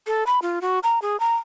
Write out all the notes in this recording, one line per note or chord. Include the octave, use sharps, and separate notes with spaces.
A4
B5
F4
F#4
A#5
G#4
A#5